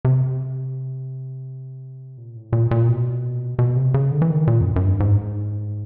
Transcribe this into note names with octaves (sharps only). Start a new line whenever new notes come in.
C3
A#2
A2
A#2
A#2
B2
B2
C3
C#3
D3
E3
D#3
A#2
F2
F#2
F#2
G2
G#2